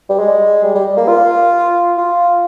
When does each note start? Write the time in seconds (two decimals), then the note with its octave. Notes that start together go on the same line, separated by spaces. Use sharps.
0.09 G3
0.20 G#3
0.64 G3
0.75 G3
0.97 A#3
1.08 F4
1.98 F4